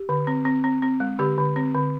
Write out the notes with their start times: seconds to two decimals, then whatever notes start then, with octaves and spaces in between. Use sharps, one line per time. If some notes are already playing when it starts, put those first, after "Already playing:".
Already playing: G4
0.09 D3
0.27 C4
0.45 C4
0.64 C4
0.82 C4
1.00 G#3
1.19 D3 G4
1.38 D3
1.56 C4
1.74 D3